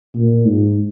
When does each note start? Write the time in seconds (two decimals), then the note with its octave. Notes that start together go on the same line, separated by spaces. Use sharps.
0.15 A#2
0.46 G#2